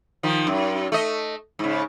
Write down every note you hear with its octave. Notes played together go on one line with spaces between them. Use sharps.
D#3 F3
F#2
A3 D#5
G#2 C#3